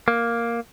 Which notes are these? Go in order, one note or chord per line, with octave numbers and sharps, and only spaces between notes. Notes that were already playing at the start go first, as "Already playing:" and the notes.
A#3